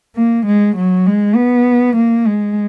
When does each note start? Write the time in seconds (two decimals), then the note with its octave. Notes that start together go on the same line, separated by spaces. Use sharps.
0.16 A#3
0.46 G#3
0.77 F#3
1.07 G#3
1.36 B3
1.96 A#3
2.27 G#3